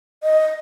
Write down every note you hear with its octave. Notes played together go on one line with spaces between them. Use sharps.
D#5